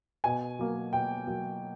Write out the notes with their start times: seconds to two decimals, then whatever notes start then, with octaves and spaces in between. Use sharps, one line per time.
0.24 B2 G#5
0.59 F#3 A#3
0.93 B2 G5
1.27 F#3 A#3